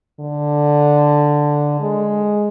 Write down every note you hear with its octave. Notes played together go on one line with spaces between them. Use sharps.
D3
G#3